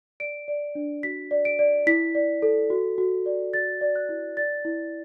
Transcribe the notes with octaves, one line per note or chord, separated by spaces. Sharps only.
D5 D7
D5
D4
F#4 B6
D5
D7
D5
E4 B6
D5
A4
F#4
F#4
D5
D5 A6
D5
F#6
E4
D5 A6
E4